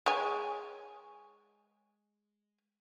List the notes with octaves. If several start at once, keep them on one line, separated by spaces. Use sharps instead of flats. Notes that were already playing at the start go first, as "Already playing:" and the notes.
G#3 C#5 G#5